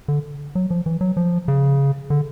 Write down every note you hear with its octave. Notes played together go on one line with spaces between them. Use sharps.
D3
F#3
F3
E3
F#3
F3
C#3
D3